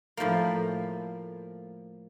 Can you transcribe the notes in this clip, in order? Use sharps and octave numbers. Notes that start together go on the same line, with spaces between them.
A2 F3 A#3